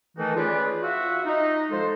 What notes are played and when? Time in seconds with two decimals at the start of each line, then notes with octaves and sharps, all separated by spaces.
0.17 D#3 E3 A3 D#4 F#4 A4
0.36 C#4 F4 G#4 B4 D5
0.82 F4 F#4 E5
1.26 D#4
1.71 F3 G#3 A4 C5